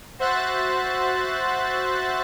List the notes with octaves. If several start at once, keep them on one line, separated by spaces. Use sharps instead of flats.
F#4 C5 E5 F#6 A6